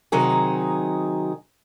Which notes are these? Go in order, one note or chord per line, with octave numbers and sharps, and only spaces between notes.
C3 D#3 F#3 D#4 G#4